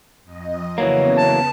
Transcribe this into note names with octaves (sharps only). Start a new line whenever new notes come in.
F2 D#5
C#3 E3 F#3 A#3 B3 C#5
A5